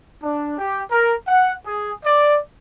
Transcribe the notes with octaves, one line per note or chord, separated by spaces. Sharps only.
D4
G4
A#4
F#5
G#4
D5